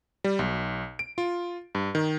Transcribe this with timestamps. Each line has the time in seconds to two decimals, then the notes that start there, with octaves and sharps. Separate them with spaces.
0.24 G3
0.39 B1
0.99 D7
1.18 F4
1.75 G2
1.95 D#3